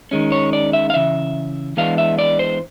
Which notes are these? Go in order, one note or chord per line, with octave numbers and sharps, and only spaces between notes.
D#3 G#3 C#4
C#5
D5
E5
F5
C#3 E3 E5
E3 G#3 B3 D4 F5
E5
D5
C5